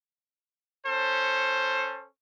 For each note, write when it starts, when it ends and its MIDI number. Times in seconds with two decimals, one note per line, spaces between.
0.85 2.05 61
0.85 2.05 69
0.85 2.05 72